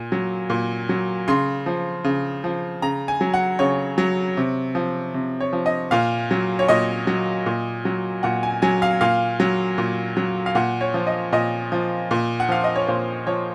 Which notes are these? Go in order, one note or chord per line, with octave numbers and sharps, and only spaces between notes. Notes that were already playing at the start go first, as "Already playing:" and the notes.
Already playing: A#2
F#3
A#2
F#3
C#3 C6
F3
C#3
F3
C#3 A#5
G#5
F#3
F#5
C#3 C#5
F#3
C3
F3
C3
C#5
F3
D#5
A#2 F5
F#3
C#5
A#2 D#5
F#3
A#2
F#3
A#2 F#5
G#5
F#3 G#5
F5
A#2 F5
F#3
A#2
F#3
F5
A#2 F#5
C#5
F3
D#5
A#2 D#5
F3
A#2
F#5
F3 F5
D#5
C#5
A#2 C5
F3 C#5